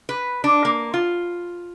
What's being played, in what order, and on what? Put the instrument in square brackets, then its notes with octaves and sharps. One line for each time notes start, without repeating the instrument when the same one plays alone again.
[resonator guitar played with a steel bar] B4
D4
A#3
F4